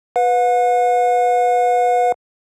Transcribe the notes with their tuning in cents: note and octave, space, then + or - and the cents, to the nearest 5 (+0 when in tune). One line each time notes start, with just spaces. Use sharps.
B4 +0 F#5 -45